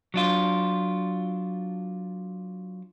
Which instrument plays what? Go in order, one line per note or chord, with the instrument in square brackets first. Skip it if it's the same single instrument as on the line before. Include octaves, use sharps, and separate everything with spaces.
[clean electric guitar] F#3 D4 F4